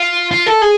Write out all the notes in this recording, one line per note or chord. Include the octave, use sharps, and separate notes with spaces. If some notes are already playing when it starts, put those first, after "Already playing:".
Already playing: F4
F4
A4
G#4